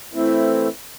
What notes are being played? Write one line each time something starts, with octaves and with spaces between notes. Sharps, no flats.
E3 A3 C4 E4